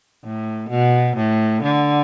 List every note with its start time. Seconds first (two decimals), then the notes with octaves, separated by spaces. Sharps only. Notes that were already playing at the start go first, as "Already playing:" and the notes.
0.24 A2
0.69 B2
1.16 A2
1.63 D3